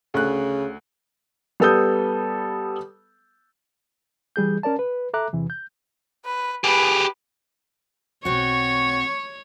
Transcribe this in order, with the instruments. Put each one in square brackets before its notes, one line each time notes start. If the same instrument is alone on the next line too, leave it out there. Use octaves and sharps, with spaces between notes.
[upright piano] D2 F#6 [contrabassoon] C#3
[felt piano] G3 B3 A4 D#6 G6
[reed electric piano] E3 G3 G#4 G6
C#4 A#4 D5 A5
B4
A4 E5 A#5 D6 F#6
E2 C3 E3
G6
[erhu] B4
[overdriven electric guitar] G4 G#4 [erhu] B4
[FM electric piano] B1 B2 [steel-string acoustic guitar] C4 F#4 [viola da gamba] C#5 [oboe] C#6